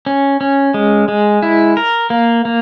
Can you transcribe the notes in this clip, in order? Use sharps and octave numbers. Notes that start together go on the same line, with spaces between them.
C#4
C#4
G#3
G#3
E4
A#4
A#3
A#3